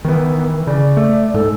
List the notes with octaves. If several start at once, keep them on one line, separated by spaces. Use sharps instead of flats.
D#3 E3 B3
C#3 D5
A3
G#2 A4